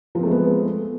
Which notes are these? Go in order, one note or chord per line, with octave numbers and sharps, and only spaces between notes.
F3 G#3 A3 B3 C4